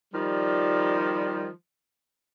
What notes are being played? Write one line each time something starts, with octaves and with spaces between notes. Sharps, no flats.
D#3 F3 G3